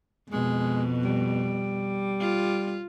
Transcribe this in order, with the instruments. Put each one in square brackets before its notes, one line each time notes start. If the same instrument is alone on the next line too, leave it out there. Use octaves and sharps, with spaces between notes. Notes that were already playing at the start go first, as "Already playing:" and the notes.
[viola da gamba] F2 B2 [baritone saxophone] G#3
[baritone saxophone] G3
[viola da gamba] F4